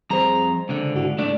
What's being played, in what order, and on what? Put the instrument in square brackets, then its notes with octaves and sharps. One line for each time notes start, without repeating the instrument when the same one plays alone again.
[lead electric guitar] F2 A#5 [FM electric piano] G3 G#4 C5
[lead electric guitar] C#2 D3
[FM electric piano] G#2 E4 F#4
[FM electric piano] G#3 D5 [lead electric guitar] A3 D4